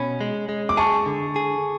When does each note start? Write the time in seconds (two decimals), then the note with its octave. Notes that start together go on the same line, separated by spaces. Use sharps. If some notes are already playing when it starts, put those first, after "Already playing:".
Already playing: B2 C#4 B5
0.21 G#3
0.49 G#3
0.69 D6
0.77 G#4 A5 C#6
1.06 D3
1.36 G#4